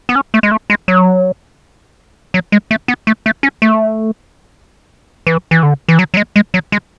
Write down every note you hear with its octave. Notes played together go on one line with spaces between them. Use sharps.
B3
C#4
A3
G#3
A3
G#3
F#3
F#3
G#3
A3
B3
A3
A3
C#4
A3
E3
E3
D3
E3
F#3
F#3
G#3
G#3
F#3
G#3